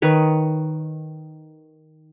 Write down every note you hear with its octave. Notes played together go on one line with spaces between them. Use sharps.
D#3 B4 C#5